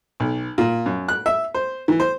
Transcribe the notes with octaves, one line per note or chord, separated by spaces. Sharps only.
B1
A#2
F#2
F#6
E5
C5
E3
C5